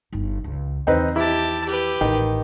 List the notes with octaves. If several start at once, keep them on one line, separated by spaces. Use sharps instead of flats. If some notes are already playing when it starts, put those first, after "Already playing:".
G1 D#4
C#2
E2 D#3 C4 D#4 B4
E4 G4 A5
G4 B4
A1 D#3